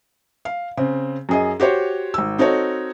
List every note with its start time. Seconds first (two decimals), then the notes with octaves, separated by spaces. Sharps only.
0.45 F5
0.77 C#3 C4
1.29 F#2 G#4 D#5
1.60 F#4 G4 C5 C#5
2.14 G#1 E6
2.38 C4 D#4 F#4 A4 C#5